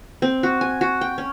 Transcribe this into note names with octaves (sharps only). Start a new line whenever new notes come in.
C4
F#4
G#5
F#4
G5
C#4